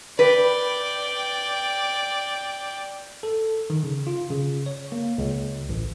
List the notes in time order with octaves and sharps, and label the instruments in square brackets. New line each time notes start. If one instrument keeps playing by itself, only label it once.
[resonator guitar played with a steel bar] B4 [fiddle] D5 G5
[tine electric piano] A4
D#3
C#3
F4
C#3
C#5
A#3
C#2
A1